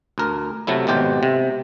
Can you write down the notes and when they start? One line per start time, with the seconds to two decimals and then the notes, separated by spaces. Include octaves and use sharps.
0.18 D2 A#4
0.67 C3 F#3 A3 E4
0.87 G#1 B2 G4 C5
1.23 C3